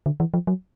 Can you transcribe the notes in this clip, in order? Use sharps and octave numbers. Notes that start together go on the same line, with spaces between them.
D3
E3
F3
F#3